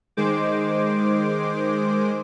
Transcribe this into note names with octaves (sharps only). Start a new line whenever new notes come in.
D#3 G#3 C5 D6